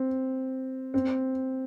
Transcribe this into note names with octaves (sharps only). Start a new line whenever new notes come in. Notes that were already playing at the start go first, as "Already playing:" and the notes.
Already playing: C4
C4